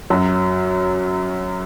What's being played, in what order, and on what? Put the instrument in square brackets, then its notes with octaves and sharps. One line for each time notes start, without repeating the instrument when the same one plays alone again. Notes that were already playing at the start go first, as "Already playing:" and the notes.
[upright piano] F#2 F#3